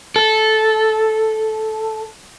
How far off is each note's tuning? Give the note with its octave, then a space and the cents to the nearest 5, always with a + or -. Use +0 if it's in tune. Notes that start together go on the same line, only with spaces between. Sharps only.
A4 -10